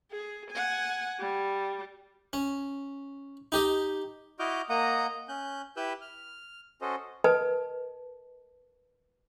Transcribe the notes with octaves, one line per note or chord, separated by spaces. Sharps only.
G#4
F#5 G#5
G3
C#4
D#4 G4 D#5
E4 F#4 D#5 D6 F6 G6
A#3 D#5 F#5 A#5 D#6
C#4 F#6 G6
E4 G4 B4 E6 F#6 G6
F6
C#4 F#4 A4 C5 D#5
A#4 B4 D#5 A5